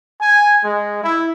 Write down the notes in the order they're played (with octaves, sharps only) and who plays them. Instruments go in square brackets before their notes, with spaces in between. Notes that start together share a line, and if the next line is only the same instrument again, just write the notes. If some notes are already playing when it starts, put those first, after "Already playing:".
[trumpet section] G#5
G#3
E4